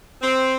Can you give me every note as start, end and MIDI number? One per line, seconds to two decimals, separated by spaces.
0.20 0.56 60